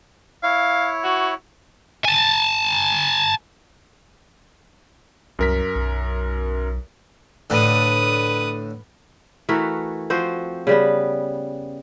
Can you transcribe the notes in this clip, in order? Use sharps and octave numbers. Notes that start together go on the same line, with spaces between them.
E4 C#5 F5
F#4
G#5 A5
C2 F#2 A#4 B6
B1
A2 D3 B4 D#6
E3 A3 F#4 A#4
F3 C4 F#4 C5
C#3 G3 B3